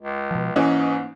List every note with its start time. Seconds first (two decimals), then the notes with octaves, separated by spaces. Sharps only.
0.02 C#2
0.31 B2 F3
0.56 G#2 E3 A#3 C#4 D#4